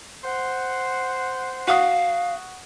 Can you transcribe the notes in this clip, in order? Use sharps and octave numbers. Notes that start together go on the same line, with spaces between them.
C5 F#5
F#4 F5 D#6